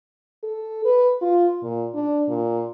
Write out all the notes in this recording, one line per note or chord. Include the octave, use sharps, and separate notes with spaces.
A4
B4
F4
A#2
D4
A#2